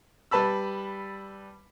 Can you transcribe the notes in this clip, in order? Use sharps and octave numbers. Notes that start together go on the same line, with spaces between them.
G3 B4 A5 B5 E6